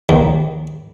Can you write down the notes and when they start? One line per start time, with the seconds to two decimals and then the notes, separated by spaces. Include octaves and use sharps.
0.09 D#2